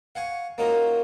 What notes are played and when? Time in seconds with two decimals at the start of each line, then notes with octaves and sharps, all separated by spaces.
0.15 F5 F#5 G#5 C#6
0.58 A#3 C#4 D#4 F4 F#4 A#4